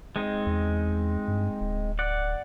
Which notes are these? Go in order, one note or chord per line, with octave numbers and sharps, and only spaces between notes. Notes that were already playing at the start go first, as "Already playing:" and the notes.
G#3 C4 D#4
E2
G2
D1
D5 F#5